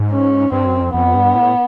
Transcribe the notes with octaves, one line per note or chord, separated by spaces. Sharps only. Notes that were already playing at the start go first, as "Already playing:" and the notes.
Already playing: G#2
C#4
G2 C4
F#2
F2
F2 B3
G2
A2